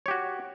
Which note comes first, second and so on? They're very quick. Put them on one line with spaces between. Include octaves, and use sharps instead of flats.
C#5 G4 F#4